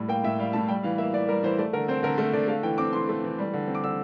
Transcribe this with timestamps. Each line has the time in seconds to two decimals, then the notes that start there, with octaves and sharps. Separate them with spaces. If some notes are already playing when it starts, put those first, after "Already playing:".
Already playing: A2 G3
0.09 A#3 G5
0.24 A2 E5
0.39 G3 F5
0.53 A2 A5
0.68 G3 G5
0.83 E3 F5
0.98 A#3 E5
1.13 E3 D5
1.28 G3 A#4
1.43 E3 C5
1.58 A3 D5
1.73 D3 A#4
1.88 C4 C5
2.03 D3 A#4
2.18 A3 A#4
2.33 D3 D5
2.48 A3 F5
2.63 E3 G5
2.78 C4 D6
2.93 E3 C6
3.09 A3
3.24 E3
3.39 G3
3.53 D3
3.68 C4
3.75 D6
3.84 D3 E6